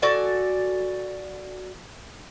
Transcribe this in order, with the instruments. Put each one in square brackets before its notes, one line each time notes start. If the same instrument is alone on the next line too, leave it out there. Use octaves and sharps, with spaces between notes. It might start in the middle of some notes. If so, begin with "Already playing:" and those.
[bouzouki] F#4 A4 D5 G#5